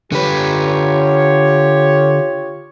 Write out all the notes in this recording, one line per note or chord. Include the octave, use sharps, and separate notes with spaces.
D3 F4 G4 B4 C#5